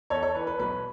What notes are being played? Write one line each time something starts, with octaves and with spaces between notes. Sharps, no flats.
E2 A4 C#5
A4 C#5
E3 B4
B4
B1 B4